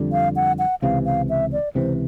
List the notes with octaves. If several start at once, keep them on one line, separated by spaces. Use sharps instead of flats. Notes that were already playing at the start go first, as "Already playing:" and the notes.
Already playing: F2 D3 G3
F5
F#5
F#5
C#2 C3 E3 F5
F5
E5
D5
C#2 C3 E3 C5